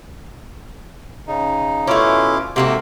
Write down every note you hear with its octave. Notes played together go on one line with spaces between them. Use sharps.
C#3 D#4
B2 A3 C#4 E4 F4 D6
G#2 C3 A#3 F#4 A4 E5 C6 D6